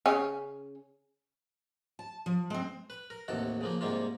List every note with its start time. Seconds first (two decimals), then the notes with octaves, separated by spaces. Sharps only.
0.06 C#3 C#4
1.99 A5
2.26 F3
2.50 G#3 C4
2.90 B4
3.10 A#4
3.28 A1 D#2 C3 F#4 A4
3.61 C#3 F3 A#3
3.81 G#2 C3 G3 A#3 F4